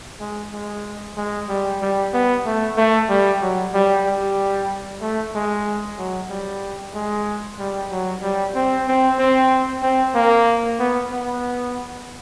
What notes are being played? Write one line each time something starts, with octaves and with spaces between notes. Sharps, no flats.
G#3
G#3
G#3
G3
G3
B3
A3
A3
G3
F#3
G3
G3
A3
G#3
F#3
G3
G#3
G3
F#3
G3
C4
C4
C4
C4
A#3
B3
B3